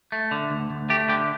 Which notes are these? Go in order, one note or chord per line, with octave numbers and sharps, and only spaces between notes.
A3
D3
D2
D2
A3 G4
D3 G4